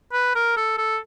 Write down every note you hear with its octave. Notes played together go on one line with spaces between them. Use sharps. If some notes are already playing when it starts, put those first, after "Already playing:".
B4
A#4
A4
A4